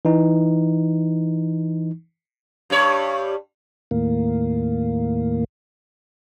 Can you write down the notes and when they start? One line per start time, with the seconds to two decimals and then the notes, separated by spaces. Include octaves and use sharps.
0.05 E3 D#4
2.70 G2 G3 C#5
3.91 D#2 A2 A#3